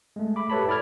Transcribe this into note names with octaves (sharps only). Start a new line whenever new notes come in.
G#3 A3
E5 B5 D6
G4 A4 B4 C#5 A5 B5
E4 D5 B5 F6 G#6